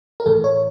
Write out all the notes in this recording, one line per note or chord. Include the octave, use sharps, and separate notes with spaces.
A#4
A2 E3 A4
C#5